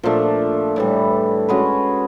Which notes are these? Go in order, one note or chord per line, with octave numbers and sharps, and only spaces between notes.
A#2 F3 A3 D4
A2 E3 G3
G#3 C#4 F#4 B4